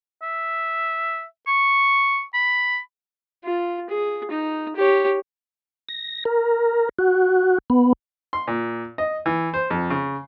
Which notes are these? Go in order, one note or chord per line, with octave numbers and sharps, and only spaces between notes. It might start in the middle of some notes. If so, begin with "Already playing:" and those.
E5
C#6
B5
F4
G#4
D#4
G4 C#5
A#6
A#4
F#4
B3
C6
A#2
D#5
E3
C5
F2
C#3